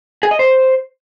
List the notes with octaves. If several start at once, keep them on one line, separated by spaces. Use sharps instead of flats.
G#4
D#5
C5